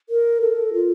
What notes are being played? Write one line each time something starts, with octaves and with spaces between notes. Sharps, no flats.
A#4
A4
F4